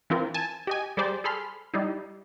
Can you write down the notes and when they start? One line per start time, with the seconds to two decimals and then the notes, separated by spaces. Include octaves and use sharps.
0.10 E3 C4 F4 A#4
0.34 G#5 A5
0.67 G4 D#5 G#5
0.97 G3 G4 G#4 C5 D5
1.24 G#4 A4 B5 C6 F6
1.74 G3 D#4 E4